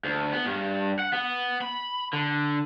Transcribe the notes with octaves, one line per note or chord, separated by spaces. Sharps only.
D2
B3
G2
F#5
B3
B5
D3